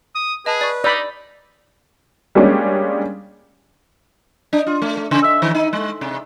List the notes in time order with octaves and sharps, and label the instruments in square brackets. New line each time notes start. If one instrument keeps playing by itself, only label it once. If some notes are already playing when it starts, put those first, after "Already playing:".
[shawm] D#6
[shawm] G#4 [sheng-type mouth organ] B4 [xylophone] D#5 A5
[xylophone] D5 C#6
[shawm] D#4 [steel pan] D5 B5 [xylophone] D6 E6 G6
[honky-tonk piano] G3 G#3 A#3 C#4 D4
[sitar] D4
F4
A3
A3
C#3
E5
D#3
D#4
G#3
C3